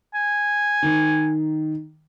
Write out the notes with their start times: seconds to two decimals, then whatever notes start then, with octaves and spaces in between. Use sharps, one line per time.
0.15 G#5
0.83 D#3